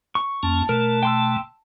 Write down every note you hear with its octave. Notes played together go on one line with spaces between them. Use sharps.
C#6
F2 A#3 C#4 A5
B2 A3 A#4
G5 C6 E6